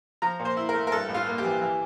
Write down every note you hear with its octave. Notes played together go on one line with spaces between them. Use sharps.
F3 A#5
A#2
C5
E4
A#4
A3
A#4
G2 A4
A1
F4
A#3
G4
E3
E3